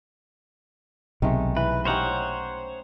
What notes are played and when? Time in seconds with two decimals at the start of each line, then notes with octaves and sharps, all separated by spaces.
1.22 B1 C3 D#3 G#3 A3
1.57 E3 B4
1.85 C#4 D#4 G4 C5 C#5 F#5